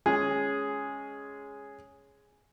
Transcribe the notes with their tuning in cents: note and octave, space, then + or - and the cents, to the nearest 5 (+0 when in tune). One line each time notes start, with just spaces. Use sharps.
G#3 -5 C#4 +0 G#4 +0